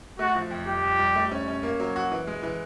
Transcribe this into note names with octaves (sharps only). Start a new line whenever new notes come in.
A3 F#4
F3
F2
G3 G4
F2
G3
A3
C#4
C#4
A#3
F#3
F#4
E3
G#3
E3